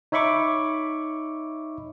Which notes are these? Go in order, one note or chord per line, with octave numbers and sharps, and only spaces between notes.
D#4 C#5 E5 B5 C#6 D6